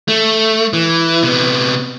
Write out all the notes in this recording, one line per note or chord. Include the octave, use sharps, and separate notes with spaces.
A3
E3
C3 B3